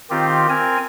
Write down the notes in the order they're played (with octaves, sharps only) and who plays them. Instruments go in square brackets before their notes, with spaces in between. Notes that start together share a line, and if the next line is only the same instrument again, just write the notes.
[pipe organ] D#3 C4 F4 G4
C4 A#4 G#5